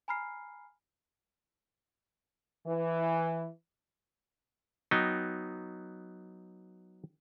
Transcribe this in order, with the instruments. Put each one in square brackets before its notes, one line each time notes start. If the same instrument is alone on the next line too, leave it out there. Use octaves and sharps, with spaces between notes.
[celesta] G#5 A#5 B5 F6 C7
[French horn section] E3
[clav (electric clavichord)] F#3 B3 D#4 G5